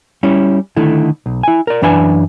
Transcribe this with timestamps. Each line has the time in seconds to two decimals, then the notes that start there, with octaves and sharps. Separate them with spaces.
0.23 G3 C#4 E4
0.77 D3 D#3 A3 E4
1.26 B1
1.43 E4 G#5
1.67 A#4 D5
1.82 F#2 E3 D4 B4 E5 G#5